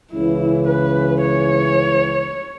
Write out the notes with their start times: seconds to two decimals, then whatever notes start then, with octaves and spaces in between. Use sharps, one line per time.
0.12 C#2 C#3 E3 E4
0.67 B4
1.21 C#5